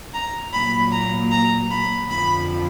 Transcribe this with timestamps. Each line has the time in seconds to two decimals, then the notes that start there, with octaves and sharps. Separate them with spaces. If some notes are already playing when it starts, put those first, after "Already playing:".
0.14 A#5
0.53 A#2 F#3 A#3 B5
0.92 A#5
1.32 A#5
1.71 B5
2.10 F2 D3 F3 B5